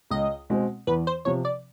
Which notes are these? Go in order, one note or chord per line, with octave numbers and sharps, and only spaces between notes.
C#2 D#5
B2 G#3 C4
E2 B4
C5
C3 F3 C#5
D5